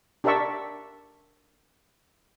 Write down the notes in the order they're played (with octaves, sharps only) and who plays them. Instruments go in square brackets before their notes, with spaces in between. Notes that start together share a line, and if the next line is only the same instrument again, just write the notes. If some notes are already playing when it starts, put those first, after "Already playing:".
[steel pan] D4 G4 A#4 D5 E5 C#6